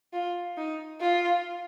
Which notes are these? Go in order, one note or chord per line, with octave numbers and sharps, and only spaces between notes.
F4
D#4
F4